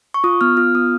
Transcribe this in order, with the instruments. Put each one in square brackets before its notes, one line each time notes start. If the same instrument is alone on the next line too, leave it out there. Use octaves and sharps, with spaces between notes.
[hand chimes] C#6
F4 D#6
B3 F6
F4 F6
B3 D#6